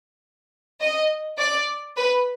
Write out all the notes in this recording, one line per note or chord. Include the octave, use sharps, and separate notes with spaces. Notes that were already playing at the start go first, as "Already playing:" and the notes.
D#5
D5
B4